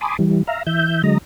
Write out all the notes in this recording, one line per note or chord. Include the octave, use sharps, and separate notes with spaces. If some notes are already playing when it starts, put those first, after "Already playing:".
G#5 A5 B5 C6 D6 D#6
E3 G3
E5 F5 A#5
E3 E5 G6
D3 F#3 G#3 D#5 A#5